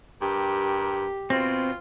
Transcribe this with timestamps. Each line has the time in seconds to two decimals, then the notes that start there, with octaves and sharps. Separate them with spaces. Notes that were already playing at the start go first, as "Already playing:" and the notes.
0.22 G2 G4 A#4
1.30 B2 C4 F4